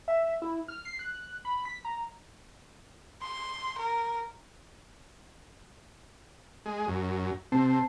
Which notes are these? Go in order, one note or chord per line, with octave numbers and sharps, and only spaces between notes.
E5
E4
F6
C7
F#6
B5
B6
A#5
C6
A#4
G#3
F#2
C3 C4 A5 C7